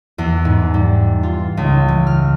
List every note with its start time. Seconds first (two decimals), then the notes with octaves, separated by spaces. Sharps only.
0.18 E2
0.45 G#2
0.74 G3
1.23 F4
1.57 C#2
1.88 E3
2.07 F6